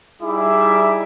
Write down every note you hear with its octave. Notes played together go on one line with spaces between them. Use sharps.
G3 D#4 E4 G#4 E5 D6